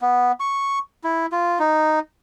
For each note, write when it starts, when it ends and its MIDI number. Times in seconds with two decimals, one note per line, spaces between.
0.01 0.32 59
0.40 0.79 85
1.04 1.26 64
1.32 1.59 65
1.59 1.99 63